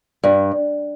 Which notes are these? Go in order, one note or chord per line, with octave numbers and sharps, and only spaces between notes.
G2